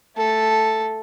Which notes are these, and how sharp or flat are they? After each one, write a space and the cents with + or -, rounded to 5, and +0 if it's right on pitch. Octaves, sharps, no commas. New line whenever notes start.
A3 +0 A4 +0